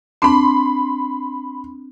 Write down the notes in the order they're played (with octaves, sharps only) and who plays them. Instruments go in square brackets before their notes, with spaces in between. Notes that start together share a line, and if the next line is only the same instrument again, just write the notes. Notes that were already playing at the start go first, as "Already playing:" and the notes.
[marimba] C4 D4 A5 [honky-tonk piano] B5 C6